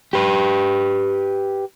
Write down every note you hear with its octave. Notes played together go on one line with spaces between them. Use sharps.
G4 B4